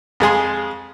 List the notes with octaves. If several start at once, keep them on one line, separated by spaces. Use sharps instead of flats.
F2 G#3 G#4 C6